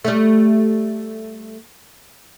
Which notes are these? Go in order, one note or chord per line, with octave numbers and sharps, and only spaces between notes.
G3 A3